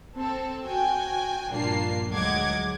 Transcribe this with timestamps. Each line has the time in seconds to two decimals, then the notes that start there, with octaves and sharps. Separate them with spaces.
0.17 C4 A4
0.63 F#4 G5 G#5
1.50 A#1 G2 A#3 D4 F4 C7
2.10 D2 F#3 G#3 F#5 D6 G#6